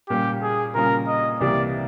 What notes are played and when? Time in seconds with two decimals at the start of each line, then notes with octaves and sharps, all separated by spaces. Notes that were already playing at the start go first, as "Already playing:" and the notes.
0.09 A#2 G3 A#3 C#4 F4 G4
0.42 G#4
0.75 A#2 G3 A#3 C#4 F4 A#4
1.08 D#5
1.40 C2 C3 E3 G3 A#3 D5